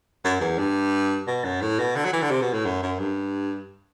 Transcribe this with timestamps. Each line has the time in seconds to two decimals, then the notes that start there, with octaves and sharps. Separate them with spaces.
0.24 F#2
0.41 E2
0.59 G2
1.27 B2
1.44 F#2
1.62 A2
1.79 B2
1.96 D3
2.05 F#3
2.13 E3
2.22 D3
2.31 C3
2.42 B2
2.54 A2
2.65 F#2
2.83 F#2
2.99 G2